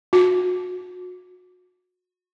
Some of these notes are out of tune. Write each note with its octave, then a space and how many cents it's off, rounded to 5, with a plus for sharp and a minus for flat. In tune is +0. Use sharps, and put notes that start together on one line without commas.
F#4 -30